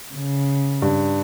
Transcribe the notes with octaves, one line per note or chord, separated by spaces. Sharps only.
C#3
G2